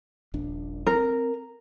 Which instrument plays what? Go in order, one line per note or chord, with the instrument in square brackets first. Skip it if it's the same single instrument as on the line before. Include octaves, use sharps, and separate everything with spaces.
[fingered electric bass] D#1 A#1 D4
[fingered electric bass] C4 [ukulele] A#4